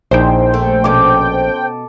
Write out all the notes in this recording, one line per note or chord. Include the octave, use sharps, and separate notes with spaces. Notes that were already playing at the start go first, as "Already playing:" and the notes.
A#1 D#4 E4 C5 G5
A3
B2 C#4 A4 D6